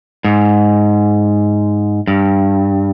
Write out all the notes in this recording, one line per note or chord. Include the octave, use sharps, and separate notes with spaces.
G#2
G2